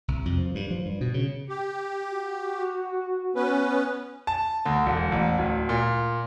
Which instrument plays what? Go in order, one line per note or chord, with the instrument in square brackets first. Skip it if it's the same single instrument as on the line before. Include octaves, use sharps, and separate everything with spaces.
[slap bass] C2
F2
F3
G2
F3
G2
B2
C#3
[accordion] G4
[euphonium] F#4
[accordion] B3 C#4 B4
[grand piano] A5
D2
E1
A1
D1
A#2